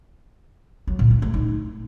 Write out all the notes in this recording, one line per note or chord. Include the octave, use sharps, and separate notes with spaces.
F#3
A#2
D4
A3
D#4